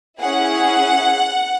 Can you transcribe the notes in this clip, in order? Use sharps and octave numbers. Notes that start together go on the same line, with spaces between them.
C#4 E4 G#4 F#5